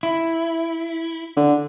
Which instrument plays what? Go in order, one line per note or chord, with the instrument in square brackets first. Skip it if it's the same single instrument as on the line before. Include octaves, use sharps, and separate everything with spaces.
[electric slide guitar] E4
[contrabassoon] D3